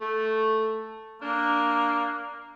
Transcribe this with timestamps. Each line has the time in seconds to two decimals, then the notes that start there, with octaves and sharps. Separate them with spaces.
0.01 A3
1.22 A#3 D4